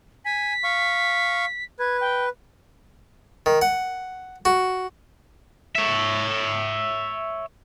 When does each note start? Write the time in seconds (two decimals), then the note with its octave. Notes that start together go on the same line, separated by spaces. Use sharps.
0.25 G#5 B6
0.64 F5 C#6
1.79 B4 G#6
2.01 G5
3.46 D#3
3.62 F#5
4.45 F#4
5.75 C#5 E5